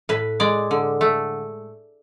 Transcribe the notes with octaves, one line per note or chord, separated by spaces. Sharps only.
A2 B4
G#3 D5
D3
A3